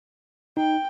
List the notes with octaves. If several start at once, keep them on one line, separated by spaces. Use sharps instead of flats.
D#4 G5